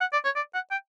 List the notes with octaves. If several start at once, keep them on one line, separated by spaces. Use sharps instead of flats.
F#5
D5
C#5
D5
F#5
G5